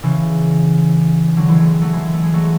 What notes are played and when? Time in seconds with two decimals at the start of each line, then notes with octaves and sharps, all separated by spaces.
0.03 C#3 E3
1.37 D3 F#3
1.48 E3 G#3
1.60 F#3 A3
1.81 F#3 A3
1.93 E3 G#3
2.13 A3
2.24 G#3
2.33 F#3 A3